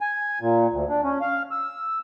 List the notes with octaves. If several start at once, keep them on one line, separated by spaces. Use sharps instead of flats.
G#5
A#2
D2
D4
C#4
F5
E6